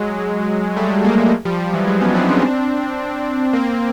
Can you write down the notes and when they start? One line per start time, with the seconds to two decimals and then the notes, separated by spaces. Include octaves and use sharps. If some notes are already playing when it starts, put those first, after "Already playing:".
Already playing: F#3 G#3
0.76 G3 A3
1.04 G#3 A#3
1.45 F3 G3
1.60 F3
1.73 E3 F#3
1.87 F#3 G#3
2.01 B3 C#4
2.15 C4 D4
2.29 C#4 D#4
2.42 C4 D4
3.53 A#3 C4